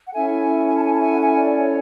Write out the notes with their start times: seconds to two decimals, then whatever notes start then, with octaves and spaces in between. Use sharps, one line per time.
0.07 F#5
0.13 C#4 E4 A4 E5 G#5
0.66 G#5
0.75 A5
0.83 G#5
0.92 A5
0.99 E5 G#5
1.11 F#5
1.20 E5 G#5
1.38 D5
1.56 C#5